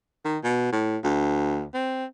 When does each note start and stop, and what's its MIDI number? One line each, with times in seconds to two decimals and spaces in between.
0.25 0.38 51
0.44 0.72 47
0.73 0.98 45
1.04 1.65 38
1.74 2.05 60